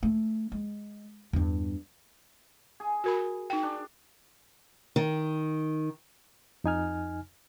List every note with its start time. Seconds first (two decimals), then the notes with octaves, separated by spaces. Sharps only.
0.03 A3
0.52 G#3
1.33 E2 G2
2.80 G#4
3.04 F#4 A#4 B5
3.50 D#4 G5
3.63 D4
4.96 D#3
6.64 F2 D#4 G#5 F6